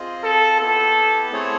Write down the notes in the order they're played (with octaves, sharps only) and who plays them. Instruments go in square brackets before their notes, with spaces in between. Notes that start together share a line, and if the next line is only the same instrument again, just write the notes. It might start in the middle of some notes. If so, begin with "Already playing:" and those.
Already playing: [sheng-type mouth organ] C4 F4 G#4 C5 D#5
[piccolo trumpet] A4
[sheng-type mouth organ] B3 E4 G4 [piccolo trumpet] A4
[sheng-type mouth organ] A3 C4 E4 G#4 C#5